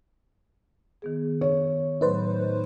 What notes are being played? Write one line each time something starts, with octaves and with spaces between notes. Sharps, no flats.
D#3 B3 G#4
C#5
A2 F#3 A3 D#4 B4 C5